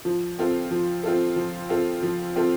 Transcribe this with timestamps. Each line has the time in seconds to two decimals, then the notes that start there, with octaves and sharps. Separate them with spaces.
0.05 F3
0.39 C4 F4 A4
0.71 F3
1.03 C4 F4 A4
1.36 F3
1.69 C4 F4 A4
2.03 F3
2.36 C4 F4 A4